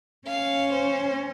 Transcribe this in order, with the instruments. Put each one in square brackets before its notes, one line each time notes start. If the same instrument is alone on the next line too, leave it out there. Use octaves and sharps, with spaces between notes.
[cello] C#4 [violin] F5
[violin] C5